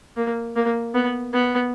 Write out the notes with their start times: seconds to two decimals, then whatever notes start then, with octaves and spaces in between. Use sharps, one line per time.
0.17 A#3
0.56 A#3
0.94 B3
1.33 B3